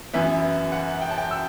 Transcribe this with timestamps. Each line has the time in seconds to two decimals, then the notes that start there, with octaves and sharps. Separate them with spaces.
0.14 F#2 E3 B3 E5
0.72 F#5
1.01 G5
1.11 A5
1.18 G5
1.31 E6